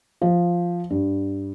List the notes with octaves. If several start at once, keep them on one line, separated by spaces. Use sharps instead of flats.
F3
G2